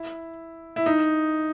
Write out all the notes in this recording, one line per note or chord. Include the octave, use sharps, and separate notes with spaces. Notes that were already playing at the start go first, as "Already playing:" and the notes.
Already playing: E4
E4
D#4